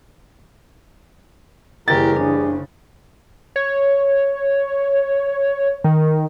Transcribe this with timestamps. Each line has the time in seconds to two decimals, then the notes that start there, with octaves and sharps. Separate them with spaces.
1.88 F#1 E3 G3 E4 G4 G#4 A#4 A6
2.16 C#3 D4
3.56 C#5
5.84 D#3